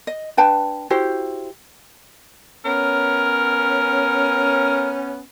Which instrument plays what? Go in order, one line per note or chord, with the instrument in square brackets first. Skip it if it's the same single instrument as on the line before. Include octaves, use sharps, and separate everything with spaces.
[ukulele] D#5
D4 B4 G5 A5
E4 F#4 G4 C5
[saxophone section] B3 C#4 [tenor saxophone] A#4